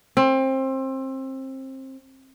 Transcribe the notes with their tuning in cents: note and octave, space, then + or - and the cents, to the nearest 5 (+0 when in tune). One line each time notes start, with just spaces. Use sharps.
C4 +25